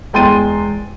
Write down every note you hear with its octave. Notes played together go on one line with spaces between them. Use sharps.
E2 G#3 G5 C6 A6 D#7